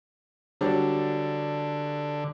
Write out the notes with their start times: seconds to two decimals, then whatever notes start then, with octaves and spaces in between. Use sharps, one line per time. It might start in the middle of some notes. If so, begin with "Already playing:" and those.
0.61 D3 F#3 G3 D4